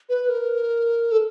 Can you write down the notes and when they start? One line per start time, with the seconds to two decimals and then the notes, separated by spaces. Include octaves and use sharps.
0.09 B4
0.29 A#4
1.11 A4